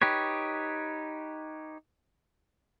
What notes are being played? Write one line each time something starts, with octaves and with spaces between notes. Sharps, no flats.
D#4 G4 B4 C#5